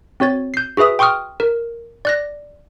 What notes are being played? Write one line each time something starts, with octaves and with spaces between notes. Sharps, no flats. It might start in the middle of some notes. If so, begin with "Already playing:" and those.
C4 F#4 C#5 A6
G6 C7
F#4 G#4 B4 E5 D#6
G5 C6 C#6 D#6 F6
A#4
D5 F#6 A#6